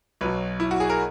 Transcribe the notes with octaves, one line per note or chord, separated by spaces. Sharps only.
B1 B2 F#3 B4
E4
F#4
G#4
A#4